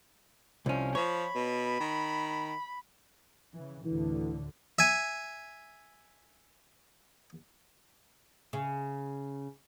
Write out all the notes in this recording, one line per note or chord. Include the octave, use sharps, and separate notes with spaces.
C2 F3 C#4
F3 C#5 B5
B2
D#3
C#3 E3
D2 A2 D3 E3
E5 G#5
C#3